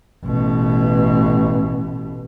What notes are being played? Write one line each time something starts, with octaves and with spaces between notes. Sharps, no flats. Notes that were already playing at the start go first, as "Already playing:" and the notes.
A1 B2